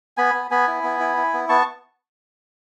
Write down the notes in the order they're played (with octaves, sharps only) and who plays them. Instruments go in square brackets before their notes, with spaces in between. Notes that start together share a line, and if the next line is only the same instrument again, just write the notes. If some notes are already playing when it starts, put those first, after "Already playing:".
[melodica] B3 G#5 B5
B3
B3 G#5 B5
E4
B3
E4
E4
B3
B3 A5 C#6